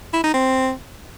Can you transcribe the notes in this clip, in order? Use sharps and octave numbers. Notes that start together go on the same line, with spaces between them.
E4
D#4
C4